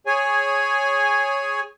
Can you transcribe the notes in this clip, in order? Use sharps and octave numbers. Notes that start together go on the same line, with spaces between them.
G#4 C#5 G#5